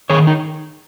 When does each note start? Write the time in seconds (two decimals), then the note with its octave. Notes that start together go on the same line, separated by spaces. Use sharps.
0.10 D#3 G#4 C#5
0.27 D#4